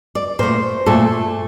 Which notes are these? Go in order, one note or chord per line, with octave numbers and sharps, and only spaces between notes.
D5
A#2 A3 C5
A#2 A3 A4